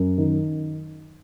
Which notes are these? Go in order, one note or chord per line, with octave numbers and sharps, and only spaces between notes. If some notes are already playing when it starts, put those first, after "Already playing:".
Already playing: F#2
D#3